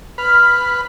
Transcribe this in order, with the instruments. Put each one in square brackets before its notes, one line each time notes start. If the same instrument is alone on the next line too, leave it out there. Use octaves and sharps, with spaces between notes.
[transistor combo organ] B4 [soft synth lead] F6